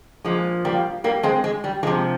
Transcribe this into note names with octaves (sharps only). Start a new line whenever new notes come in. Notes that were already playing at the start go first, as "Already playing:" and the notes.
A#2 F3 G#3
G3 A#3
G3 A#3
G#3 C4
G#3
G3
C3 F3 G#3